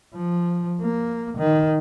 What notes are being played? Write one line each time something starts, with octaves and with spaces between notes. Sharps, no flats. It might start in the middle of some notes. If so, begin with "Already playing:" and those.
F3
A#3
D#3